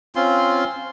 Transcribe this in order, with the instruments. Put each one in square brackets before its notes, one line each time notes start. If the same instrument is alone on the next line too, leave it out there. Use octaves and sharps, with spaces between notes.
[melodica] C4 C#4 F4 C6